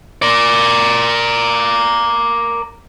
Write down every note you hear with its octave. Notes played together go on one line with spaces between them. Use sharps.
A#4 D5